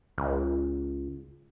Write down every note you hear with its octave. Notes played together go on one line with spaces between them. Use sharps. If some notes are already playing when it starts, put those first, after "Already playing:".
C#2